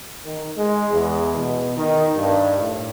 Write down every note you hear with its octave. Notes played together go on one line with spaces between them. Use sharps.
D#3
G#3
E2
B2
D#3
G2
A2